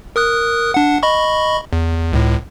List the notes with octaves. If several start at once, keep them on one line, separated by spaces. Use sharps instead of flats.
A#4 D#6 F#6
D4 F#5
D#5 B5 C#6
E2
C#2 A2